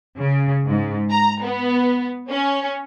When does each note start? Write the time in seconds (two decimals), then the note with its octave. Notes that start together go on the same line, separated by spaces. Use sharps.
0.17 C#3
0.65 G#2
1.10 A#5
1.43 B3
2.29 C#4